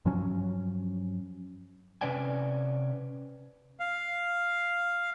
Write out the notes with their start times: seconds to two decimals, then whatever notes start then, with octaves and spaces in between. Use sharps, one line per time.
0.05 G2 F3 F#3 C#4
2.01 C3 C#4 B4 D5 G5 G#5
3.80 F5